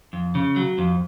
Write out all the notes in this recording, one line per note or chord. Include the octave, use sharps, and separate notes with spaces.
F2
C#3
F#3
F2